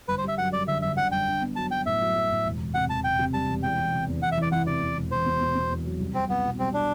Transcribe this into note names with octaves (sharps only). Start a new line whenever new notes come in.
G1 B4
C5
G3 E5
F#2 F#5
G3 D5
D3 E5
G1 E5
D3 F#5
G1 G5
D4
B3
F#3 A5
F#3 G5
A2 E5
F#3
F#3
A2
E1
E1
C3 F#5
E1 A5
E1 G5
C3
G3 A5
E1
E2 G5
E2
C3
E2
E2 F#5
E5
E3 D5
E3 F#5
C3 D5
E2
E1
E2 C5
B2
B2
B2
E2
F#3
C2
C2 C4
C2 B3
B2
G3 C4
D4